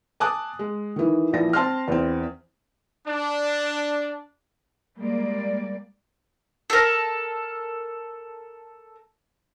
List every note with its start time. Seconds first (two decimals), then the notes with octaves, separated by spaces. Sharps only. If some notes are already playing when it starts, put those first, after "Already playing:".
0.20 G#5 A5 D6 D#6 F#6
0.59 G#3
0.96 D#3 E3
1.33 A#1 E3 F3 A#6
1.53 C4 A5 C6 F6
1.88 E2 C4
3.07 D4
4.98 G3 G#3 A#3 D5
6.70 A4 A#4